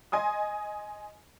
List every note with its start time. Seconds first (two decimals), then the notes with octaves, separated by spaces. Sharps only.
0.12 D#5 G#5 C6 D#6